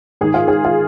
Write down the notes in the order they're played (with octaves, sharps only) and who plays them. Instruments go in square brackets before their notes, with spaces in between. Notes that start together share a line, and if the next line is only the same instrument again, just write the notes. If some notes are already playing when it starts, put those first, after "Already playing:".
[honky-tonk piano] G#2 D#3 G#4
F4
G#4
F4